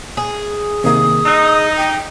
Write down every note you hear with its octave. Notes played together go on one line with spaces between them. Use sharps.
G#4
C3 D#3 A#3 D#6
D#4 D#5 E6
G5